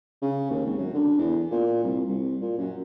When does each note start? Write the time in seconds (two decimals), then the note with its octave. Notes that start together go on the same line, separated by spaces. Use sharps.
0.22 C#3
0.50 D#2
0.65 G#1
0.78 F#2
0.94 D3
1.18 E2
1.51 A#2
1.83 C2
2.08 C2
2.41 A#2
2.58 F#2